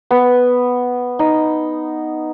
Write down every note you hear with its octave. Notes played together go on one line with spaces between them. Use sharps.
B3
D#4